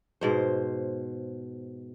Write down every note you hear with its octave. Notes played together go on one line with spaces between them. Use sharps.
G#2 B2 C5